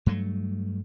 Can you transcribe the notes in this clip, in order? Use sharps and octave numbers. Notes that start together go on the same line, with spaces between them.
G2 F#3 A3